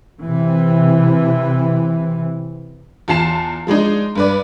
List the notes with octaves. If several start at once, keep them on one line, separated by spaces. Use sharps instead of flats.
C3 E3
E2 F4 A5 C7 E7
F3 G#3 D4 D#4
G2 B4 D5